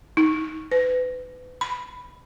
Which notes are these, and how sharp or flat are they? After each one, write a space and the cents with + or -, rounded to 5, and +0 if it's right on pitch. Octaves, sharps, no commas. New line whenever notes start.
D#4 +20
B4 +30
B5 +5